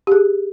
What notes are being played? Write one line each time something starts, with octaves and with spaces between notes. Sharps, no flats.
G4
G#4